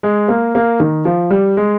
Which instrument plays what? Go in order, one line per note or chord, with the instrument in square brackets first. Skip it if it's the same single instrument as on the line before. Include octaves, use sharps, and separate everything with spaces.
[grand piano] G#3
A#3
A#3
D#3
F3
G3
G#3